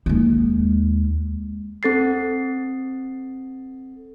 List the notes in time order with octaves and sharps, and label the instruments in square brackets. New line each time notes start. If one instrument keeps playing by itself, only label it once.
[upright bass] D#2 G#3
[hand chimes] C4 A4 A6 C7